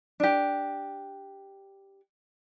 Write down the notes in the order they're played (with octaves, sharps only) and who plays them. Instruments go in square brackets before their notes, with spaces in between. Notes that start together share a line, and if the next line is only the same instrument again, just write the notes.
[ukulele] D4 G4